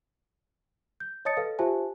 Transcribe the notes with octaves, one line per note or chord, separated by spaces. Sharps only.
G6
C#5 D#5 A5 D#6 A6 C#7
A4 B4 F5
F4 G4 C5 E5 G#5 A5